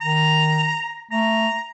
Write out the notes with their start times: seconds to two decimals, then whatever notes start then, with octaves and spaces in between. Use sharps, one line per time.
0.01 D#3 A#5
1.11 A3 A#5